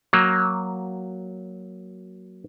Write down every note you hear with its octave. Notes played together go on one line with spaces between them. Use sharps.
F#3 A#3